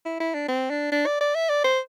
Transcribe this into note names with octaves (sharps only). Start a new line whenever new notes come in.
E4
E4
D4
C4
D4
D4
D5
D5
E5
D5
C5